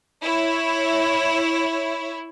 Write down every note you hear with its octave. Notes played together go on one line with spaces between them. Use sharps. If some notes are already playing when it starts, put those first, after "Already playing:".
E4 C#5